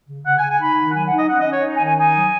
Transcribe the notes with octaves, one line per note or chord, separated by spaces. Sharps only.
C#3
C#3 F#5
G#5
C#3
G#5
D#4 B5
D#3
F#5
F#3 G#5
F#5
D#4
D#5
C#4 F#5
D#5
C#4
C#5
D#4
G#5
D#3
G#5
D#4 G#5
F#3